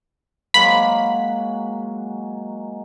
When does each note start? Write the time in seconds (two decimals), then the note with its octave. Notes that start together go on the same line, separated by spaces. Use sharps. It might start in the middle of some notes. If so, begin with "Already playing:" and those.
0.54 F#3 G#3 A#3 B5